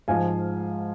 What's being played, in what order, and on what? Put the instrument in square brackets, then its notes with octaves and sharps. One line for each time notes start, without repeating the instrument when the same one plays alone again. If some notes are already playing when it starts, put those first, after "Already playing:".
[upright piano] G#2 F3 F5 G#5